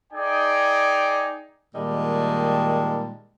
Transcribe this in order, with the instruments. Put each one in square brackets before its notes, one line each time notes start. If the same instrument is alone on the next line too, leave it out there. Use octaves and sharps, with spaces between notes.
[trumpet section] D#4 G#4 D5 G5 G#5
[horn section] A#2 D#3 G3 G#3 A5